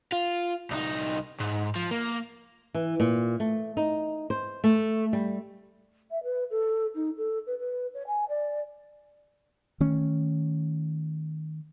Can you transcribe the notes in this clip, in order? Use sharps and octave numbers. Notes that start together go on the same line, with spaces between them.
F4
C2 D#4
G#2
F3
A#3
E3
A#2
A3
D#4
C5
A3
G3
E5
B4
A4
D#4
A4
B4
B4
C#5
G#5
D5
D#3 A3 C#4